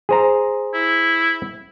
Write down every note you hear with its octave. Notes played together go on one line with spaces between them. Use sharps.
G#4 C5 A#5
E4